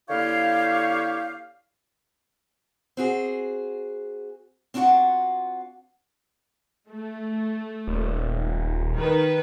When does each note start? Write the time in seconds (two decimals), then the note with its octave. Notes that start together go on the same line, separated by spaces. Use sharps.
0.10 D3 A#3 E4 G4 C#5 F5
2.97 C4 F#4 G#4
4.74 C4 D4 F4 F#4 F#5
6.90 A3
7.87 D#1
8.95 D#3 B4